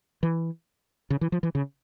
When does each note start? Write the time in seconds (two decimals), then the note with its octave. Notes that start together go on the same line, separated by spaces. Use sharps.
0.23 E3
1.10 C#3
1.21 E3
1.32 F3
1.43 E3
1.55 C#3